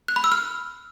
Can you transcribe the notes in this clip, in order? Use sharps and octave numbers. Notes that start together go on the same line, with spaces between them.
F#6
B5
E6
F6